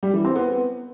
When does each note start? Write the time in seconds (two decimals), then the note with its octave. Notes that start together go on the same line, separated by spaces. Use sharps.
0.03 G3
0.14 E3
0.25 C4
0.36 B3